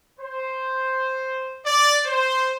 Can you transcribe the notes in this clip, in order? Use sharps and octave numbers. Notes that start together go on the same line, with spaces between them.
C5
D5
C5